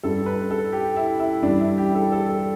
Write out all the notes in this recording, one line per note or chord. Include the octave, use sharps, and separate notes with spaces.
G2 G3 A4
B4
A4
G4
E4
E4
G2 E3 G3 D4
E4
G4
A4
A4
A4